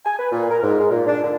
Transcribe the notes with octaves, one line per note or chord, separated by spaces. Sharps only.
G#5
B4
A#2
A#4
G#2
G#3
A#2
D4
D3